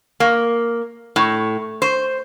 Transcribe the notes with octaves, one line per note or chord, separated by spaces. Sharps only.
A#3
A2
C5